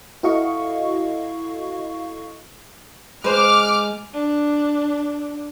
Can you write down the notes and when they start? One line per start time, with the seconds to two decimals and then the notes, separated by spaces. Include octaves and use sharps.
0.23 E4 F#4 A4 D#5 F5 C#6
3.24 G#3 B4 C5 D6 F6
4.13 D4